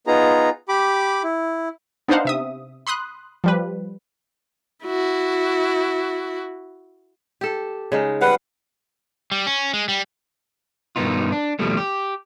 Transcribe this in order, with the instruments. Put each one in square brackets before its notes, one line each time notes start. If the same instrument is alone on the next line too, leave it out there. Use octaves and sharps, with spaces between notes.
[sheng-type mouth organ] B3 D#4 F4 G#4 A#5
G4 B5 D6
E4
[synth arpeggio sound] B3 D4 D#4 C5 F5 F#5
C3 E5 D#6
B5 C6 D#6 F#6
F3 G3 B4
[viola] E4 F#4
[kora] G4 A4
C#3 G#3 D#4
[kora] G3 F5 [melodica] B4 F#5
[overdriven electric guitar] G3
C#4
G#3
G3
[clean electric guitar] G2 B2 D#3 B3 D#4 F4
D4
D#2 B2 F3 G3 A3
G4